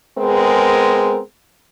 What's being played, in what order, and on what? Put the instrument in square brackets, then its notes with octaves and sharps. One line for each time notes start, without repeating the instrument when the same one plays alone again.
[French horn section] G#3 B3 C4 G#4 A#4